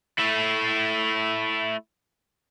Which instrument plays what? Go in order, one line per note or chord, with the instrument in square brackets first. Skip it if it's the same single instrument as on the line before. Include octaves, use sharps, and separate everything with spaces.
[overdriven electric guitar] A3 E4